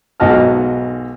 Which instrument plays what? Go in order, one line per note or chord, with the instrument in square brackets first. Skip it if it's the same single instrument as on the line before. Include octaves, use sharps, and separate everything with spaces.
[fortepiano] B1 G#2 F#4 D#5 A5 F6